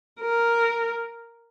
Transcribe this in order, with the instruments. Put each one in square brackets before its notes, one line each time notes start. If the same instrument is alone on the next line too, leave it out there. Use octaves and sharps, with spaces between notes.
[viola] A#4